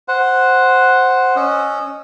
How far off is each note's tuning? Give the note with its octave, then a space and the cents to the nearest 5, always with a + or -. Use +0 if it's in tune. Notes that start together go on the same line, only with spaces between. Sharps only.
C5 +0 F#5 +0
C#4 +0 D#5 -20 E6 +0